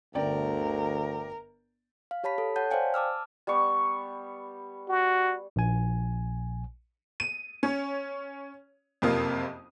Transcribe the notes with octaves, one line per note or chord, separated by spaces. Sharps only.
G1 D2 A#4 D5 G5
F5
G4 C#5 A5 B5 B6
A4
C#5 F#5 A5 F#6 G6
C5 D5 F5 G5 G#5
A5 D6 E6 F6
G3 B3 C#6
F#4
A#1 G#5
D#7
C#4 C#5
F#1 F2 C3 A#3 F4 D#6